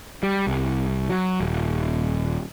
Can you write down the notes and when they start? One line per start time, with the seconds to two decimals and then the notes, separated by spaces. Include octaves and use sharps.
0.23 G3
0.47 C2
1.09 F#3
1.41 D#1